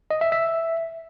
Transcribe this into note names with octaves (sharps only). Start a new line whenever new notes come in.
D#5
E5
E5